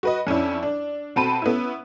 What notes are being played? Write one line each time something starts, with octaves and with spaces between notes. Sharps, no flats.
F#4 B4 D#5
F2 C#4 D4 E4
D4
B2 C4 A4 A5 B5 D#7
B3 C#4 E4